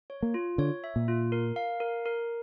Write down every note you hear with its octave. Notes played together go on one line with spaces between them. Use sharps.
C#5
A#3
F4
D3 C#5
E5
A#2
F4
A#4
F5
A#4
A#4